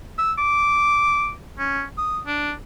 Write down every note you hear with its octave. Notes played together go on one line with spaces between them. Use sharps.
E6
D6
C#4
D#6
D4